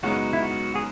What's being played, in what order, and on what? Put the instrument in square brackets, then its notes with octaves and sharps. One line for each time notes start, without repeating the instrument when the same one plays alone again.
[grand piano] F#2 C#3 G#3 B3 D#4 [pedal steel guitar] F#4
[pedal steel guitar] E4
F#4
G#4